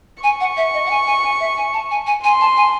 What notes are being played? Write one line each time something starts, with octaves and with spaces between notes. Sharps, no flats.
G#5 C#6
F#5
E5
D#5
F#5
G#5
G#5
G#5
E5
G#5
A5
G#5
G#5
G#5 C6
A5
G#5